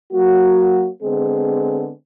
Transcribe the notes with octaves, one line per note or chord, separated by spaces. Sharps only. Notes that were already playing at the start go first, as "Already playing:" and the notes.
F#3 A#3 F#4
D3 G#3 B3 C4 G#4